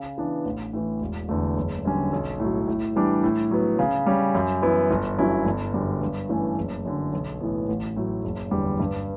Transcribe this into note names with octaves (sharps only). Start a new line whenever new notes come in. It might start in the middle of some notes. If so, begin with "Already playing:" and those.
Already playing: C#3
E3 B3 D4
A1
A2 E3
E1
E2 D3 A3
F#1
F#2 D3 G3 C#4
B1
A2 F#3
A2
E3 G3 D4
A2
F#3 B3
C#3
G3 C#4
F#2
E3 B3 E4
G1
G2 F#3 C#4 E4
G1
F#2 D3 G3
G2
E3 A3 C#4
F#1
F#2 D3
B1
A2 E3 B3
A1
A2 F#3
F#1
E2 D3 G3
G2